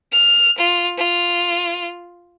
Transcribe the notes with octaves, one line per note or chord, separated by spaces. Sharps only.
F6
F4
F4